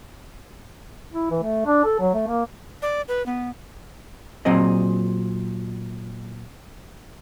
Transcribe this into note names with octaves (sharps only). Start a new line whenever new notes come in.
E4
E3
A3
D4
A4
F#3
A3
A#3
D5
B4
B3
A#2 F#3 C4 G#4 D#5